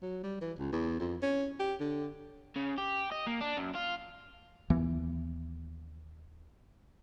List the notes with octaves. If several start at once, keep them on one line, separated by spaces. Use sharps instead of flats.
F#3
G3
E3
C#2
E2
F2
C#4
G4
D3
C#3
G4
D#5
A#3
D4
F#2
F4
D#2 E3 B3